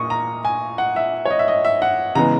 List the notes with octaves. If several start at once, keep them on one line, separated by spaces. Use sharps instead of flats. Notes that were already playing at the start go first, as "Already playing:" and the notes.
Already playing: A#2 A#3 C#6 D#6
A#5
G#5
F#5
E5
C#5
D#5
E5
D#5
E5
F#5
C#3 E3 G#3 B3 A#5